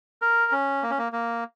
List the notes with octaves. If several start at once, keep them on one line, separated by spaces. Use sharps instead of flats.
A#4
C#4
A#3
C#4
A#3
A#3